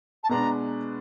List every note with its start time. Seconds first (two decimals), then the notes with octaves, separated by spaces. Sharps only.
0.23 A5
0.29 B2 G#3 B3 D4 A#5